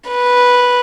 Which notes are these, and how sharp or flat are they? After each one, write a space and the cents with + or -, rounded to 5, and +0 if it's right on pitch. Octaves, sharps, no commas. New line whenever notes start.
B4 -5